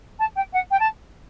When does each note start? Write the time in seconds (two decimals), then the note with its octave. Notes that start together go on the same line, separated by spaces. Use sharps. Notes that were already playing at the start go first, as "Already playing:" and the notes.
0.19 A5
0.36 G5
0.53 F#5
0.71 G5
0.79 A5